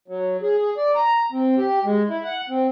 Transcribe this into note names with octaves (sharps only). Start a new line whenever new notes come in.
F#3
G#4
G#4
D5
A#5
C4
G4
G#3
E4
F#5
C4